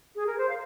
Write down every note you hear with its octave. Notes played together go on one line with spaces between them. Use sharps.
G#4
A#4
C5
F5